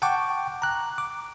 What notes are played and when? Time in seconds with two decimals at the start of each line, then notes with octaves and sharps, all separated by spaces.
0.02 F#5 G5 A5 C#6 D6
0.62 A#5 F#6
0.98 D6